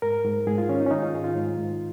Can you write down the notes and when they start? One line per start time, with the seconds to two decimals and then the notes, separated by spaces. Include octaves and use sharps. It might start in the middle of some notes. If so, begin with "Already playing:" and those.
0.02 G#2 A#4
0.24 G#2
0.46 G#2 G#4
0.58 F4
0.68 D#3 C#4
0.80 D#4
0.86 C#4
0.91 D#3 D#4
1.02 F4
1.13 G#2 G#4
1.24 F4
1.36 G#2
1.58 G#2